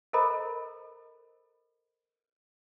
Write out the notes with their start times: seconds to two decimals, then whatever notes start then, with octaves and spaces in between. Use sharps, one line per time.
0.13 A4 A#4 C5 D#5 A#5 B5